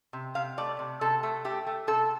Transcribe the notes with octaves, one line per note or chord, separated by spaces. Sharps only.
C3
C3 F5
A3 D5
C3
C3 A4
A3
A3 G4
A3
C3 A4